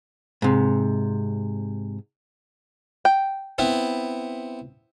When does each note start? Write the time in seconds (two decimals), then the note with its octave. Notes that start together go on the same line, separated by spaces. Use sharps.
0.42 G#2 C3
3.05 G5
3.58 B3 C4 E4